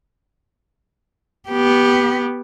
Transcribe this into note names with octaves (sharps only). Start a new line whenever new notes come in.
B3 G4